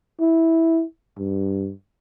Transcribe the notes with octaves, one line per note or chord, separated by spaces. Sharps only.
E4
G2